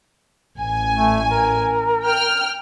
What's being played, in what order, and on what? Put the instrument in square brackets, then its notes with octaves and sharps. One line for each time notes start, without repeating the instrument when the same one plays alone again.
[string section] A1 G#5
[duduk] A3
A#4
[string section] G5 F6